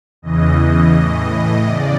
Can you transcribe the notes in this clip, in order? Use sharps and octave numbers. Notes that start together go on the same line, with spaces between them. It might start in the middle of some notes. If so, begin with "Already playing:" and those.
E2 C#3 E3 D#5
A2 E3
E2 C#3 D5